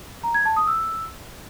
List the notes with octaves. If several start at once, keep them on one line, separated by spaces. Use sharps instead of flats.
A#5
G#6
A5
D#6
E6